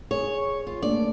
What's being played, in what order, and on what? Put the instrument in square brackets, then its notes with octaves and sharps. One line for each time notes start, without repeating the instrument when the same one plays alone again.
[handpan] G#4 [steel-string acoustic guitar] C#5
[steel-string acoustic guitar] F4
[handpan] A3 A#3 D4 [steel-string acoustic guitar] D5